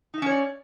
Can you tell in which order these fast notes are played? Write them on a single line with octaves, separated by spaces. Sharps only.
D#4 E5 C#4 C#5 D5